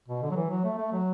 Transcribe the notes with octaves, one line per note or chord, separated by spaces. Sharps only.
B2
D3
F#3
E3
F#3
A3
A3
F#3